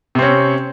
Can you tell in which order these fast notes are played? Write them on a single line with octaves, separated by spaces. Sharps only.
C3 C4 C#4